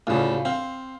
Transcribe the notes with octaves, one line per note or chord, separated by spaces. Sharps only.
D2 A2 C#3 F4
C4 F5